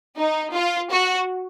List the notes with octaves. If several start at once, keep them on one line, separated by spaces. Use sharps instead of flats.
D#4
F4
F#4